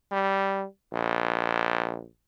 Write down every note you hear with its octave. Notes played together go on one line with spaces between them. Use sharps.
G3
A#1